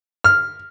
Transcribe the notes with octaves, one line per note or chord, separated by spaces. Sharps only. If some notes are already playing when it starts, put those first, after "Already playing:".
F6